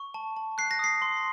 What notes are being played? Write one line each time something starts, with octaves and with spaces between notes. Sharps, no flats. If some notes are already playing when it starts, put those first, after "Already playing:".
Already playing: C#6
A5
A5
F#6 C7
A#6
D#6 C7
C6